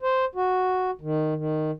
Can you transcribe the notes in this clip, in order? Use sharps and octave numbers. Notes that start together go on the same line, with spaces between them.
C5
F#4
D#3
D#3